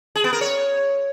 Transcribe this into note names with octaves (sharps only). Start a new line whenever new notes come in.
G#4
B3
A#4
C#5